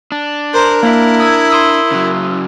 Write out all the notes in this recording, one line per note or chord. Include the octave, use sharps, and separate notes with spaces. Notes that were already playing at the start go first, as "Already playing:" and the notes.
D4
A#4 C5
A#3 E4
D#6 E6 G#6
C6 D#6 E6
C#3 F#3